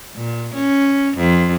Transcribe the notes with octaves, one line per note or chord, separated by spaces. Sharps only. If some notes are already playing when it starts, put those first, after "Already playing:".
A#2
C#4
F2